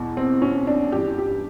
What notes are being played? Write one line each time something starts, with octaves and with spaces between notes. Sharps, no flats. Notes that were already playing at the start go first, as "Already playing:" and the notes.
Already playing: E2 B2
C4
C#4
D4
G2 E3 G4
G4